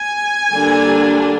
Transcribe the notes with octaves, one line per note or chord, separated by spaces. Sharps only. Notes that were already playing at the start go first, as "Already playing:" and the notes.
Already playing: G#5
D3 G3 A#3 D4